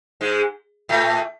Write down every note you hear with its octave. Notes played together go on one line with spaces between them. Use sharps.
G#2 G#3
A2 A3